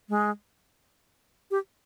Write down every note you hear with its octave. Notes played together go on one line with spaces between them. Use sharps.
G#3
G4